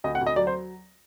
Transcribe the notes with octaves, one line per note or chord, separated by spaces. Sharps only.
D2 D#5
F#5
D2
D#5
F#3 D5
C5